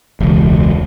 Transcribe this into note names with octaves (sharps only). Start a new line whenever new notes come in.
E1 C#2